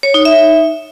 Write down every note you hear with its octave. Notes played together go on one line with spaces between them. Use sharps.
C#5
D#4
E5